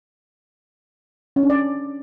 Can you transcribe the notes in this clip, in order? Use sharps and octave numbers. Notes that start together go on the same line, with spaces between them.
C#4
D4
D5